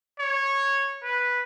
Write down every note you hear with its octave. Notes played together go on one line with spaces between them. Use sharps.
C#5
B4